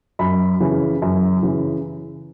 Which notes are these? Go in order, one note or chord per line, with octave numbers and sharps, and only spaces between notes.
F#2 B5
C#3 E3
F#2
C#3 E3